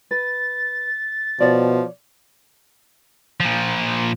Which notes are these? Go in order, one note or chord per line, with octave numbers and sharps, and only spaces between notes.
B4 A6
B2 F3 C#5 D5
A#2 F3